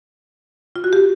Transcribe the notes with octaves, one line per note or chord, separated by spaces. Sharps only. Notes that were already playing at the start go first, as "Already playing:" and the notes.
F4
F#4
G4